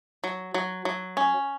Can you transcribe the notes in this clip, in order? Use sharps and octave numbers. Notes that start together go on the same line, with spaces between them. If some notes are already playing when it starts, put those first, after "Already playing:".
F#3
F#3
F#3
C#4